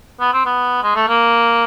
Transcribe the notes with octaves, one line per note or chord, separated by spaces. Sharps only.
B3
C4
B3
G#3
A3
A#3